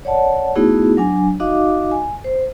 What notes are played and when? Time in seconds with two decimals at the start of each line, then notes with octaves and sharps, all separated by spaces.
0.05 C#5 D5 F#5 A5
0.55 A3 B3 D#4 E4 F#4 G#4
0.97 F#3 D4 G#5
1.40 D#4 F#4 D#5 F5 D6
1.91 G#5
2.24 C5